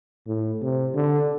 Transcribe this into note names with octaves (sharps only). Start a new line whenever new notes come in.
A2
C3
D3